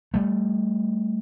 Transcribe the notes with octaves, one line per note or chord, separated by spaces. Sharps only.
G3 A3